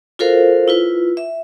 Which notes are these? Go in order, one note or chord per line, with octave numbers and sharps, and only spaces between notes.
F4 F#4 A4 A#4 C5 F5
E4 F4 B4
E5